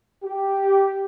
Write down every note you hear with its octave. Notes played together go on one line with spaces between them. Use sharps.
G4